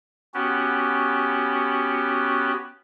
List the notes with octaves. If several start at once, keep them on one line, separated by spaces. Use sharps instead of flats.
B3 C#4 F#4 G4